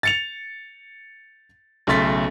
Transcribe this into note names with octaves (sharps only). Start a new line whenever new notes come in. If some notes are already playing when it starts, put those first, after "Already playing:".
A6 C#7 F7
B1 C#3 A3 C6 A6 B6